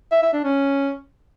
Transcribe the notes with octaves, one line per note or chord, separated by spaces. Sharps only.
E5
E5
D4
C#4